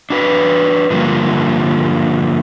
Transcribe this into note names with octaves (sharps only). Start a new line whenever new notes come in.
D4 F#4 B4
G2 D3 F3 G3 A#3